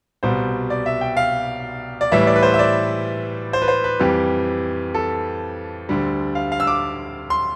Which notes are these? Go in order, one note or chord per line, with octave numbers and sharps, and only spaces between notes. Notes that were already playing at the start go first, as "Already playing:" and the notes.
C2 B2 G3 C5
D5
E5
G5
F5
D5
A2 E3 G3 E5
D5
B4
C5
E5
D5
C5
B4
C5
B4
F2 E3 G3 G4
A4
D2 D3 G3
F5
F5
E6
D6
C6